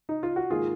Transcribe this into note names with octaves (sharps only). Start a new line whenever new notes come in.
D#4
F4
F#4
G#2 D#3 A#3 F4 G#4